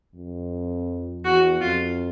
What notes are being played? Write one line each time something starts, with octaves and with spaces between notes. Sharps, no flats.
F2
E2 F#4
F2 F4